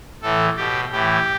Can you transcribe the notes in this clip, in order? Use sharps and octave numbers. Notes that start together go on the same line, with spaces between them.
A2 E3 A4
B2 G4
A2 E3 G4